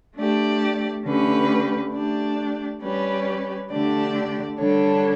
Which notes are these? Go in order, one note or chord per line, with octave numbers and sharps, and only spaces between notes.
A3 D4 G4 D5
D3 A3 C#4 G4 B4
A3 D4 G4 D5
G3 C#4 G4 B4 D5
D3 A3 D4 G4 D5
D3 G3 D4 A4 C#5